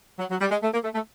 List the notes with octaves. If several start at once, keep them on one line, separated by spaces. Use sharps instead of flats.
F#3
F#3
G3
G#3
A3
A#3
A3
A3